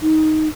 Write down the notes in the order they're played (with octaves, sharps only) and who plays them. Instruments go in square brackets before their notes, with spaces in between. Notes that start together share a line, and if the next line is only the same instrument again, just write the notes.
[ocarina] D#4